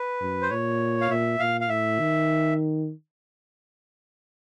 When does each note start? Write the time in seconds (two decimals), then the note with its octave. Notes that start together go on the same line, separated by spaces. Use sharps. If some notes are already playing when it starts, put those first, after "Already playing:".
Already playing: B4
0.21 F#2
0.42 C5
0.50 A#2 C#5
1.01 F5
1.10 A#2 E5
1.39 A#2 F5
1.61 F5
1.69 A2 E5
2.00 D#3